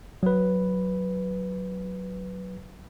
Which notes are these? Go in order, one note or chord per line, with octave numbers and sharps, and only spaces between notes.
F#3 B4